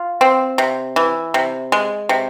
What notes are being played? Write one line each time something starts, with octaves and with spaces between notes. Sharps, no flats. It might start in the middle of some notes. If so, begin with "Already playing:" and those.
Already playing: F4
C4
C3
E3
C3
G#3
C3